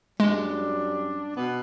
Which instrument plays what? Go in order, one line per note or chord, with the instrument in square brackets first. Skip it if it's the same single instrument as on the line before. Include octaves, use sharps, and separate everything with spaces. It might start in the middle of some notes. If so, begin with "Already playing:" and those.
[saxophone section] F#2 G3 D4 [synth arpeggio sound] G#3
[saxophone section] B2 B3